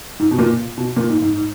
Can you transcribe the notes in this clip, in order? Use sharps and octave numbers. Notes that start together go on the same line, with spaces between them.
G#2
B2
A#2
B2
A#2
G#2
G#2